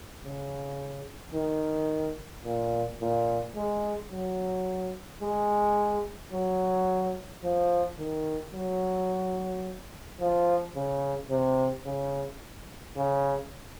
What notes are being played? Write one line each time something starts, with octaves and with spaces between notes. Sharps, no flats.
C#3
D#3
A#2
A#2
G#3
F#3
G#3
F#3
F3
D#3
F#3
F3
C#3
C3
C#3
C#3